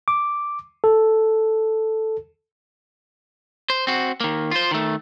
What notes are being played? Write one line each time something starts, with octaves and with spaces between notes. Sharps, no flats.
D6
A4
C5
C4 F#4
D#3 A#3
F4 C5
D#3 A3